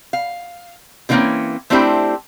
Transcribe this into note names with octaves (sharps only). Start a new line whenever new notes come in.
F5
B2 D3 E3 A#3 C4 C#4
A3 C4 D4 E4 G4 C5